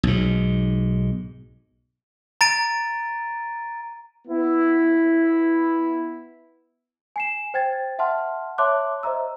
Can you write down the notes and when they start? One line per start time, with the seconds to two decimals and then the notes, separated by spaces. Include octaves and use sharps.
0.03 B1 G#2
2.41 A#5 A6 D7 D#7
4.27 B3 E4
7.16 G#5 C7 E7
7.54 C5 G5 G#6 A6
7.99 E5 F#5 A5 C6 F6
8.58 C#5 E5 A5 C6 D6 F#6
9.03 C5 D#5 E5 A#5 E6